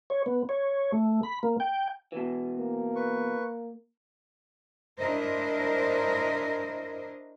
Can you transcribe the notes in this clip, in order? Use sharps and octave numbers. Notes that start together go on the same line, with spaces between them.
C#5
B3
C#5
A3
B5
A#3
G5
B2 E3
A#3
B4 C#6
D4 E4 A#4 C5 D#5